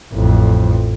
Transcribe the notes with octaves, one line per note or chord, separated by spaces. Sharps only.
A1 F2